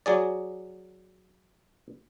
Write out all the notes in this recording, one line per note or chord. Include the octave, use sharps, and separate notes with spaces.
F#3 G#4 D5